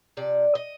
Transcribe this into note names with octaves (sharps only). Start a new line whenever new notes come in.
C3 F3 D5
D#5